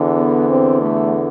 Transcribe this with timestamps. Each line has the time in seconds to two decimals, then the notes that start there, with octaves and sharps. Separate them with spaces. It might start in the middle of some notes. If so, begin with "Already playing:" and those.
Already playing: E2 D3
0.16 B3
0.48 C4
0.80 A3